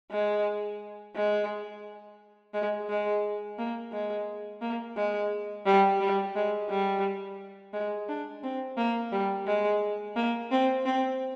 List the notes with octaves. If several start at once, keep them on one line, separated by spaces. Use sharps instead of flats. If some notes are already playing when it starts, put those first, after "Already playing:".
G#3
G#3
G#3
G#3
A#3
G#3
A#3
G#3
G3
G3
G#3
G3
G#3
D4
C4
A#3
G3
G#3
A#3
C4
C4